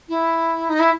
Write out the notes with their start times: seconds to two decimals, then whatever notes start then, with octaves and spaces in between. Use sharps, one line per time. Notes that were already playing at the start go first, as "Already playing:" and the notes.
0.09 E4
0.69 D#4
0.80 E4